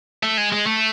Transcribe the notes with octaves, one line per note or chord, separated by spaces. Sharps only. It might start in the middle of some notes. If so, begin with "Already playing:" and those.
A3
G#3
G#3
A3